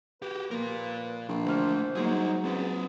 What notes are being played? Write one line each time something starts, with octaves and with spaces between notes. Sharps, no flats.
F#4 G4 B4
A#2 F3 A#3 A#4
A#1 C5
D2 E3 A3 C5 F6
G#2 F#3 G3 A#3 G#4
C#2 C4 C#4 B4